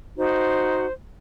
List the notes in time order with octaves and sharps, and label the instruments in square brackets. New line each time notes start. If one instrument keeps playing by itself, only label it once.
[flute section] D#4 F#4 C5